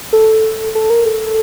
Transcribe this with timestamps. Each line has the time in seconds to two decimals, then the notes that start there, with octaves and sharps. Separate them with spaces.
0.13 A4
0.75 A4
0.90 A#4
1.06 A4